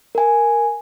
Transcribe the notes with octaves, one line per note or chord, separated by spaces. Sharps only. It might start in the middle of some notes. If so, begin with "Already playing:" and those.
A#4 G#5